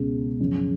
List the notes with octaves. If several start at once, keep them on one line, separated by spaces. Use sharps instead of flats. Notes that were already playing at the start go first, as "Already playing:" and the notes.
Already playing: C#2 B2 G#3 C#4
F#2 C#3 F3